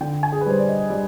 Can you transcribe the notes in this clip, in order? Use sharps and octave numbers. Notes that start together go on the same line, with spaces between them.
D3 G5
G#5
G#4
B4
G3 C5
D5
D#5
G3 D5